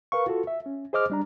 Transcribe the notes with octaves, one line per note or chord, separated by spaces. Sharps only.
A#4 B4 F5 C#6
F4 F#4 A4
E5
C#4
G#4 C5 D#5 D6 F6
G3 D4 A#5